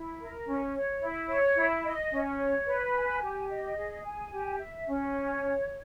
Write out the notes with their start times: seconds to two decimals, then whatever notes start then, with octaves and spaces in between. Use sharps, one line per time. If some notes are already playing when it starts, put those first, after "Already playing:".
Already playing: E4
0.19 A#4
0.46 C#4
0.74 C#5
1.01 E4
1.29 C#5
1.57 E4
1.84 D#5
2.11 C#4
2.38 C#5
2.66 B4
2.93 G#5
3.21 G4
3.49 D#5
3.76 G#4
4.04 G#5
4.31 G4
4.58 E5
4.86 C#4
5.13 C#5